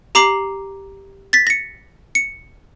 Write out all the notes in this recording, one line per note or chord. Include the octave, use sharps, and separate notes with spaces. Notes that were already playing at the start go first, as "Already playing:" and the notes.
G4 A#5 D6 C7 F#7
A6 B6
A#6 C#7
C#7